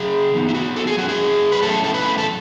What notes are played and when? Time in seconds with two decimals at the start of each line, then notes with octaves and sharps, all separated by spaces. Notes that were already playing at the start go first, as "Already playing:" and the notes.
Already playing: C#3 F#3 C#4 G#4
0.33 E3 B3 D#4
0.49 E4
0.55 F#4
0.76 A4
0.87 G#4
0.98 F#3 C#4 E4 F#4
1.09 G#4
1.52 B4
1.62 A2 F#3 C#4 E4 A4
1.84 A4
1.94 B4
2.18 A4